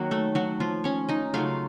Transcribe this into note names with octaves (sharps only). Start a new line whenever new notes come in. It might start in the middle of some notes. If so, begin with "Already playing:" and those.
Already playing: D#3 F#3 A#3 F#4
A3 A4
F#3 F#4
F3 F4
C#4 C#5
D#4 D#5
C#3 F#3 A3 F4 F5